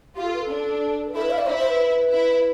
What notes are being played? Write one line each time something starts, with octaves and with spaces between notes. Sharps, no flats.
F4 G4
A4
B4
A4
D4
B4
E4 A4
B4
F5
D5
E4 C5
C5
B4
E4